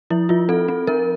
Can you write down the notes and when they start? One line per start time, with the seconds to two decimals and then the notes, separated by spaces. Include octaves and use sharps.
0.10 F3 E4
0.29 F3 F4
0.49 C4 A4
0.68 C4
0.87 F3 A#4